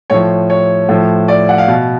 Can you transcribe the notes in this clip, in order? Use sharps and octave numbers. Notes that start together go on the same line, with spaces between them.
A2 F3 C#5
C#5
A2 F3
D5
F#5
F5
B2